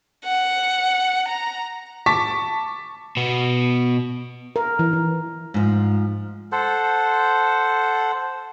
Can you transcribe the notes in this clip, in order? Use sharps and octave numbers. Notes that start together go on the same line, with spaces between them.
F#5
A#5
A5 C#6 D6 B6
B2 B3
A#4
E3
E3
G#2 F3
A4 C5 F#5